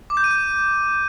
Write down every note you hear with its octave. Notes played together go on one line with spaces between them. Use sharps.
D6
G6
D#7
G6